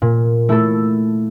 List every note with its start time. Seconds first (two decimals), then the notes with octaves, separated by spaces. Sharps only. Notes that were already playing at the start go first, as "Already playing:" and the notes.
0.02 A#2
0.49 A3 E4 A4